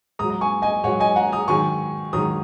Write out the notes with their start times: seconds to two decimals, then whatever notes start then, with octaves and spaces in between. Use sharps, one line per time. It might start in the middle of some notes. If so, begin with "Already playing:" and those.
0.19 G#2 F#3 A#5 D#6
0.30 A#5
0.41 G#5 C#6
0.62 D#5 G#5
0.84 G#2 F#3 C#5 F#5
1.00 D#5 G#5
1.16 F#5 A#5
1.32 A#5 D#6
1.48 G#2 D#3 F#3 G#5 C#6
2.13 G#2 D#3 F#3 A#5 D#6